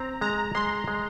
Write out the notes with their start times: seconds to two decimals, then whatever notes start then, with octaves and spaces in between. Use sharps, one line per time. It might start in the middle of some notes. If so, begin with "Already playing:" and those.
Already playing: C4 A#5
0.21 G#3 A#5
0.55 G#3 C6
0.88 G#3